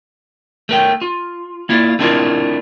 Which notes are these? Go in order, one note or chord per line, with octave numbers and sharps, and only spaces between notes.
A3 A#4 G5
F4
A#3 E4 F4 D5
A3 C4 D4 E4 F4 A#4